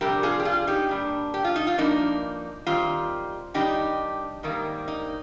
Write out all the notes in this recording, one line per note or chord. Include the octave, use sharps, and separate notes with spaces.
F2 C3 G3 D4 G4 A#4
F4 G#4
G4
F4 G#4
D#4 G4
A#2 G3 D4
G4
F4
D#4
F4
G2 F3 A#3 D4 D#4
D#3 G3 C4 F4
D#3 G3 D4 D#4 G4
G#2 D#3 G3 A#3
D#4